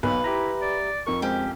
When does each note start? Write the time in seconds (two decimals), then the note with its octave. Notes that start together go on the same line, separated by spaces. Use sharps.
0.03 B1 A#3 B4
0.24 E4 G4 E5 A#5 A#6
0.62 D5
1.07 F2 A#4 C#6
1.22 G#3 C4 C#4 G4